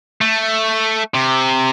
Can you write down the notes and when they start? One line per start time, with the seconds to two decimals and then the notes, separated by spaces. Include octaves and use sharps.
0.21 A3
1.14 C3